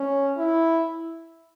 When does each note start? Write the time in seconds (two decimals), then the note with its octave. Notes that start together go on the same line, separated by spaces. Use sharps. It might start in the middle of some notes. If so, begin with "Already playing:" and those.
Already playing: C#4
0.38 E4